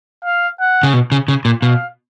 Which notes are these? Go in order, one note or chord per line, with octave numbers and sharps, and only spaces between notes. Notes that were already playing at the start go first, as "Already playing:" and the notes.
F5
F#5
C#3
B2
C#3
C#3
A#2
B2 F5